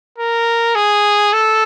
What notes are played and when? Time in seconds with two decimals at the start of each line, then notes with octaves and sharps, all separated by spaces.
0.18 A#4
0.75 G#4
1.33 A4